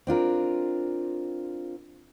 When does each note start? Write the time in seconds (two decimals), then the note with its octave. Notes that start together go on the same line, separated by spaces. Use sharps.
0.07 C4 D4 F4 A#4